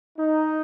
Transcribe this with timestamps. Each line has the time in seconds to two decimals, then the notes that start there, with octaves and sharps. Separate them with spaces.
0.19 D#4